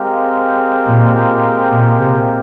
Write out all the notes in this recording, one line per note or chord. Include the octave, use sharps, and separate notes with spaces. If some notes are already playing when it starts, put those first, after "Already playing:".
Already playing: G#3 C4 G4 A#4 F5
A#2
A#2
C3